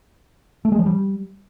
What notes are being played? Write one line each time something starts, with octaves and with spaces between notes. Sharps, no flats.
A3
G#3
F3
G3